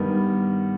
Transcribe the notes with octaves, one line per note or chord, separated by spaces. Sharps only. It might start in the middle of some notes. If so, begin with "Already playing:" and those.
Already playing: G2 D#3 G3 B3